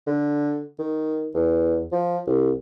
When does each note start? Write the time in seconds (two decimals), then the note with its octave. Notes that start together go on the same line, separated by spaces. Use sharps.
0.07 D3
0.79 D#3
1.34 E2
1.92 F3
2.27 C2